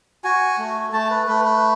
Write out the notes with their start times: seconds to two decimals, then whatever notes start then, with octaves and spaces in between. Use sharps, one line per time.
0.24 F#4 G#5
0.58 A3
0.92 A3 A5
1.10 B4
1.27 A3 B4
1.45 B4